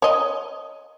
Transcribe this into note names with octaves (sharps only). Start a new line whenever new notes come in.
C#5 D#5